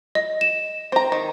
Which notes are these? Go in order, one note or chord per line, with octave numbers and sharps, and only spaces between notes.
D#5
E7
C4 A#5
D#3